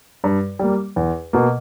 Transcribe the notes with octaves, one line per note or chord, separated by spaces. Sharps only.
G2
G3 A#3
E2
B2 A#3